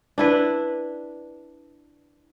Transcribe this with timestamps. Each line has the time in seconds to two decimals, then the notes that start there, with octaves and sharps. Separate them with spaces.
0.18 D4 E4 B4